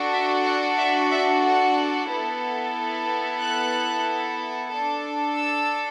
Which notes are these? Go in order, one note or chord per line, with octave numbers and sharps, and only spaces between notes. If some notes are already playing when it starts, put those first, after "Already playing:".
Already playing: D4 F#4 A4
E5
F#5
E5
E5
F#5
B3 E4 A4
F#6
D4 A4
E6